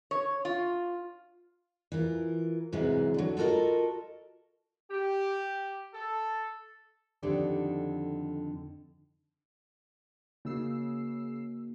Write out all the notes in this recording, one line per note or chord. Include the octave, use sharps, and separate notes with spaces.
C#5
F4
E3 F4 A#4
G#2 C3 E3 F#3 B3 C4
D3 F#3
F4 F#4 A4 A#4 D#5
G4
A4
F2 D3 D#3 D#4 G4 D5
C#3 A#3 D#4 F#4 E6 C7